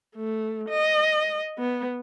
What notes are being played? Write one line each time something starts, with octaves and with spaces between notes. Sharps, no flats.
A3
D#5
B3